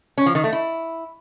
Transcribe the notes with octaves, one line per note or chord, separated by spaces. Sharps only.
C#4
F3
D#3
A3
E4